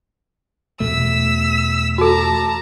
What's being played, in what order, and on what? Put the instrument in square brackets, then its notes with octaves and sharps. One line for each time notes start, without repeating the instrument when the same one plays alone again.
[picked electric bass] E2 B2 A3 [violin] E6 B6
[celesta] F#4 A4 [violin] A5 A#5